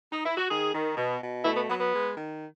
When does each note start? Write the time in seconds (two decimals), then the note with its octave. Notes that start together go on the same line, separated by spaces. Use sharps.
0.12 D#4
0.25 E4
0.37 F#4
0.50 D#3 G#4
0.74 D#3
0.97 B2
1.22 B2
1.45 A3 E4
1.57 B3
1.69 F#3 B3
1.81 B3
1.93 G#3
2.17 D#3